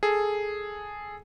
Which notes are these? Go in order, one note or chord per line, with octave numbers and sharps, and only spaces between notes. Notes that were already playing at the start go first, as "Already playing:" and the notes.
G#4 A4